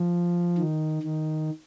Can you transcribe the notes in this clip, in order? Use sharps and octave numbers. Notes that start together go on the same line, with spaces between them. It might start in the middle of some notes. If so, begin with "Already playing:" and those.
Already playing: F3
D#3
D#3